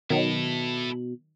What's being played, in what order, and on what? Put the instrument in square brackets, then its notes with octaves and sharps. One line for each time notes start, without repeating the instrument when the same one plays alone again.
[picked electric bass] B2 [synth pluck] D#3 F#3 [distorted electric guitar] E4 A4